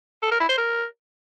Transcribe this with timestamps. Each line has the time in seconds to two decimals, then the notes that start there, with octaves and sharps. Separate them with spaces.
0.22 A4
0.31 A#4
0.40 E4
0.49 C5
0.58 A#4